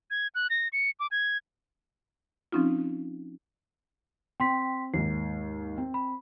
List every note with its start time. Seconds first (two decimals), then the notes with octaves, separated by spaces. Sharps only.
0.11 G#6
0.35 F#6
0.50 A#6
0.73 C#7
1.00 D6
1.11 G#6
2.52 F3 C4 C#4 D#4 F4
4.40 C4 G5 C6 B6
4.94 D#2 G#2 C7
5.78 C4
5.94 B5